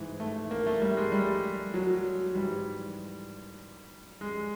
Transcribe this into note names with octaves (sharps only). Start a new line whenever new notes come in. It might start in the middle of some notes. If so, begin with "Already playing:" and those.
Already playing: G#2 E3
A3
A#3
A3
G3
G#3
G3
F#3
G#2 E3 G3
G#3